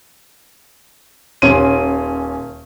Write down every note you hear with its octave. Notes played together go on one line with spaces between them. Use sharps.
D#1 C#4 C6 D#7